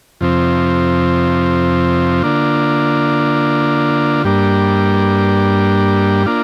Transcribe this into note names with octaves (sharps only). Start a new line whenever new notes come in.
F2 C3 F3 C4
D3 A#3 D4 F4
G2 G3 A#3 D4
A#3 D4 F4